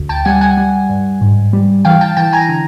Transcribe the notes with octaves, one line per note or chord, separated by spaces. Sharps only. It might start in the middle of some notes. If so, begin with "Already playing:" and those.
Already playing: D2
G5 A5
G3 F#5 G#5
F#5 G#5
G3
G2
G#2
G3
E3 F5 G5
G5 A5
E3 G5 A5
G#5 A#5
D3